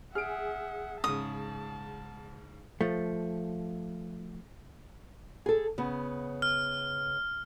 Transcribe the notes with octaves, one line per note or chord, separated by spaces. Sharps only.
G#4 E5 F#5 F6 D7
G#2 C#3 A5 D#6
F3 A3
G#4 A4
C#3 B3
F6